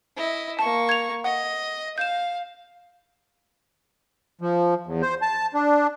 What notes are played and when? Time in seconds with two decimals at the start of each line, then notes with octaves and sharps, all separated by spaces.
0.16 E4 D#5
0.59 A#3 A5 C#6
0.89 G#6 F7
1.24 D#5 F#5
1.98 F5 G6 E7
4.41 F3
4.87 E2
5.02 C5
5.22 A5
5.54 D4